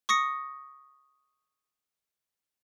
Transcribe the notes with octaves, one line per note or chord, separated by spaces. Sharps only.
C#6 D#6 A#6 C#7